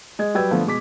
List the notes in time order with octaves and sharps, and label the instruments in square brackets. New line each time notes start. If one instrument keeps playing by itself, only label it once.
[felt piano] G#3 D#5 G#6
F#3 G3 B4 G5 E6 G#6
D3 F3 A3 B3
B2 G#3 D6 B6